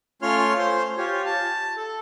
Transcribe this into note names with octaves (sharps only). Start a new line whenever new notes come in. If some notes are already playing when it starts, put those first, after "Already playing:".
A3 C#4 F4 C#5 C6 F6
C5 C6
F4 G4 C#5 G#5
A5
A4